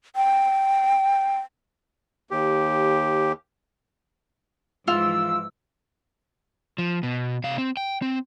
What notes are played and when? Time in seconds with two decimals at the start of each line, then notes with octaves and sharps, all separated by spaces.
0.16 G5
2.31 D#2 G4
4.88 G#2 E3 F3 F4 E6
6.78 F3
7.03 B2
7.44 C3 F5
7.58 C4
7.77 G5
8.02 C4